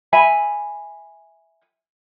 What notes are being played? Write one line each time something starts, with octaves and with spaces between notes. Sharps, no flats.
E5 G#5 B5